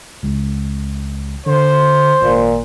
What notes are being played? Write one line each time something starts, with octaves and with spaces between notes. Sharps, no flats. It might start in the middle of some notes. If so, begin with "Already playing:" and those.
C#2
D3 C5
G#1 A#2